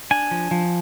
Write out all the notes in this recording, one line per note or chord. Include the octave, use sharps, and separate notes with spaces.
D4 G#5
F3
F3